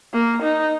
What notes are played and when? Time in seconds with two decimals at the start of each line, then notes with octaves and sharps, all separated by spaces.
0.13 A#3
0.43 D#4